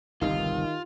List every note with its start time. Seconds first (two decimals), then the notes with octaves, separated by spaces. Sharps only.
0.21 G1 C2 D#3 D#4 F4 G4 A#4